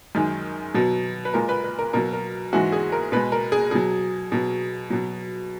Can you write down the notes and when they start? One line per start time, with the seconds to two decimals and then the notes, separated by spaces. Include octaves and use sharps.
0.15 F#2 D#3 G#3
0.74 B2 F#3
1.25 B4
1.34 A#2 G#3 A#4
1.49 B4
1.64 B4
1.79 A#4
1.93 B2 F#3 A#4
2.13 A#4
2.53 G#2 E3 G#3 F#4
2.72 G#4
2.92 A#4
3.12 B2 G#3 B4
3.32 A#4
3.52 G#4
3.71 B2 F#3 G#4
4.32 B2 F#3
4.90 B2 F#3